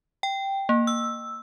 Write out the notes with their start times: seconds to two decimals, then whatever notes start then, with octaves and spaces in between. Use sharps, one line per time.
0.23 G5
0.69 A#3
0.87 E6